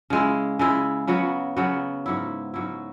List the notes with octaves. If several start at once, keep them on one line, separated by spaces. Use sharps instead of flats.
C#3 G#3 E4
C#3 G#3 E4
C#3 F#3 B3 F#4
C#3 F#3 B3 F#4
G#2 F#3 E4
G#2 F#3 E4